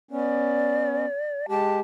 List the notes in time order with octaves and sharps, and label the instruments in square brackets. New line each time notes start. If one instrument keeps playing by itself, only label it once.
[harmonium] B3 C#4 [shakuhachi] D5
[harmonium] G#3 G4 [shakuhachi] A5